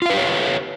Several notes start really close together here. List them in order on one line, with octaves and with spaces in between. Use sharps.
F4 F5 B4 G4 C#5